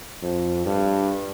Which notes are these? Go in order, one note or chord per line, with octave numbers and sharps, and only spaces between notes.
F2
G2